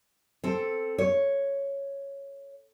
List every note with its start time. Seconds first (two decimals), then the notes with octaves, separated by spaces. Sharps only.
0.44 C4 A4
0.98 C#5